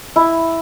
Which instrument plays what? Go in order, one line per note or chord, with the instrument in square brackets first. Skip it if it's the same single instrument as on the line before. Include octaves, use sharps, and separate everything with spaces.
[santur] E4